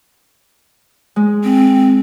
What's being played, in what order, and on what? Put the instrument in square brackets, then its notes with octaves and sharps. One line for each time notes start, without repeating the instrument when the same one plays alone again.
[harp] G#3
[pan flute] C4